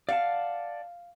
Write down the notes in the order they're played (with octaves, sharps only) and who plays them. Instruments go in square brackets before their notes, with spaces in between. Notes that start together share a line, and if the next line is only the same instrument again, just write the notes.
[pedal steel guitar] D5 F#5 A5 [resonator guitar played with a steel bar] F5